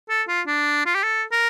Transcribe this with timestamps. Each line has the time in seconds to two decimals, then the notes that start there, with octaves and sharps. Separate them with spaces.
0.09 A4
0.28 F4
0.47 D4
0.86 F4
0.95 G4
1.03 A4
1.32 A#4